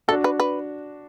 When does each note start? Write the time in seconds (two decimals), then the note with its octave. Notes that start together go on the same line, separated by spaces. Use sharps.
0.08 D4 F#4 A4
0.24 B4
0.40 B4